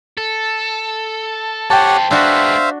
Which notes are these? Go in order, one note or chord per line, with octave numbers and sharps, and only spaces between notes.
A4
G4 A4 C5 C#5 F#5 G5 A5
G#3 B3 D4 F#4 C5 E5 F5